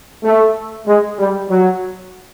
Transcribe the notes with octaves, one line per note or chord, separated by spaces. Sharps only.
A3
G#3
G3
F#3